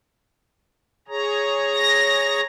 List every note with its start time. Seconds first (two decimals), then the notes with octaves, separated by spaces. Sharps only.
1.08 G#4 C#5 A#5
1.75 A#6